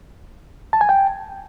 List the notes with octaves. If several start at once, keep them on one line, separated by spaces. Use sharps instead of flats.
A5
G#5
G5